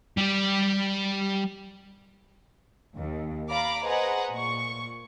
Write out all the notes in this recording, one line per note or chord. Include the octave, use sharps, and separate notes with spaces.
G3 G4
D#2
D5 F5 A#5 B5 D6
G#4 B4 C5 D#5 F#5 A#5
A#2 C#6